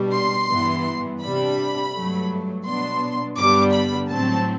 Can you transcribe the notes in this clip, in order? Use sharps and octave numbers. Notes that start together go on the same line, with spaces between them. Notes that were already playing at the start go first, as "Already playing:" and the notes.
Already playing: B2 G3 D4
C6
G2 E3 B3
C3 G3 D4 B5
G2 F#3 A3
B2 F#3 B3 D4 C6
G2 D3 G3 B3 D4 D6
B5
A2 F#3 C4 A5